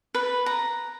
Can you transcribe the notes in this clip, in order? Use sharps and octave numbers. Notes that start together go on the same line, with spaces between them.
B4
A#5